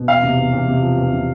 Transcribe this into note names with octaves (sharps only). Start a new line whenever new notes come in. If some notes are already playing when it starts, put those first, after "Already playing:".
Already playing: B2
E2 F5
C3
E2
E2
C3
F3
E2
C3